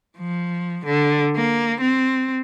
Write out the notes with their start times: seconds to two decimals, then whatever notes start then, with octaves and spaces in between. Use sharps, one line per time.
0.18 F3
0.85 D3
1.36 A#3
1.81 C4